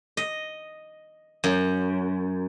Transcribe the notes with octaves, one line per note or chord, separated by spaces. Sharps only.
D#5
F#2